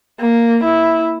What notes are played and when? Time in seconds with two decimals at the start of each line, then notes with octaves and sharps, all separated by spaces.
0.20 A#3
0.64 E4